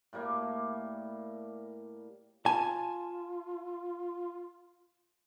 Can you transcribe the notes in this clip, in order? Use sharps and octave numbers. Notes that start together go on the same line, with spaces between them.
A2 G3 A#3 C#6
F4 G#5 A5